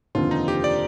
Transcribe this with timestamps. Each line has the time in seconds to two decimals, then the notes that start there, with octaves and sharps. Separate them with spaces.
0.15 F1 D#2 D3 F3 C4 F4
0.31 D#4
0.48 G4
0.64 D5